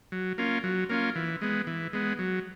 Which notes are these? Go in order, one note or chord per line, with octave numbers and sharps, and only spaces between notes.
F#3
A#3 C#4 F4
F#3
A#3 C#4 F4
E3
G#3 B3
E3
G#3 B3
F#3